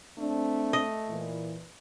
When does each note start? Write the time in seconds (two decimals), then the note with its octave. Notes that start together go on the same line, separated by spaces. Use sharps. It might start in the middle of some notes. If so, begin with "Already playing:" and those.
0.18 A3 C4 D4
0.73 D#5
1.09 A#2 E3